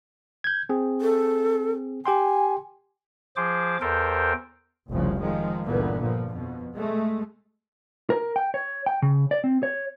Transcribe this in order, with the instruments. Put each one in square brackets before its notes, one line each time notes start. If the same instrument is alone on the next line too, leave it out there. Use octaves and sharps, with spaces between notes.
[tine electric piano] G6 G#6
C4 G#4
[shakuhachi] A4
[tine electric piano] G4 G5 C6 [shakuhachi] G#5
[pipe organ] F3 G#4 C5 D6
E2 A4 A#4 C5 G5
[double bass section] F1 C2 C#3 F3
D#3 F3 G#3
G1 C#2 A#2 D3 E3 B3
A#1 A#2 F3
F2 B2
G#3 A3
[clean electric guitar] A#4
G5
C#5
G5
C#3
D5
C4
C#5